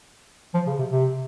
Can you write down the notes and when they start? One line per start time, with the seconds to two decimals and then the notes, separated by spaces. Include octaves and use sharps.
0.54 F3
0.67 C#3
0.79 C3
0.90 C3